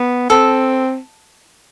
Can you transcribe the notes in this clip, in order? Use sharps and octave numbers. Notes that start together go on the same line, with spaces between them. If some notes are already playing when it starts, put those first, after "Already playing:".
Already playing: B3
C4 A4